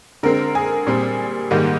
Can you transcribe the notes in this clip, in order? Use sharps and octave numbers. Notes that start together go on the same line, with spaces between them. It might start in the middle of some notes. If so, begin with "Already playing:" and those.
D3 G#3 C4 A#4
G#4
A#2 G3 C4
G#2 D#3 G3 A#3